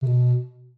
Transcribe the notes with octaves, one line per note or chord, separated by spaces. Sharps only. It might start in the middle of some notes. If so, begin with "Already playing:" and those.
C3
B2